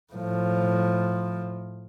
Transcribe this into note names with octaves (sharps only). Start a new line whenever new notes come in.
A2 F3